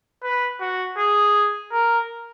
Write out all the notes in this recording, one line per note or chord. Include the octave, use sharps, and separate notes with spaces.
B4
F#4
G#4
A#4